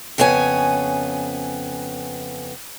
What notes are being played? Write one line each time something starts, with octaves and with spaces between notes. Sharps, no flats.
F2 C#3 B3 C#5 G#5